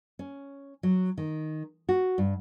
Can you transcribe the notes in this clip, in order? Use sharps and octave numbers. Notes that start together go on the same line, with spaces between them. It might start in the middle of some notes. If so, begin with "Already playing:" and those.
C#4
F#3
D#3
F#4
G2